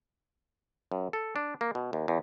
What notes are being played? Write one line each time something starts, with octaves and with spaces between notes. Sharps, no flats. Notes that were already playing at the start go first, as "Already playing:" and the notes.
F#2
A4
D4
A#3
B2
D#2
E2